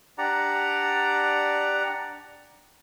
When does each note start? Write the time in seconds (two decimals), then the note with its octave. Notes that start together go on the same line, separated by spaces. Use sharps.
0.18 D4 G4 D5 F#5 A#5